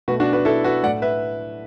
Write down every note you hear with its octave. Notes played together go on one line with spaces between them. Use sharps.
B2 A3 F#4 B4
D4 F#4
F#4 B4
E4 A4
F#4 B4
A2 A3 D5 F#5
B4 E5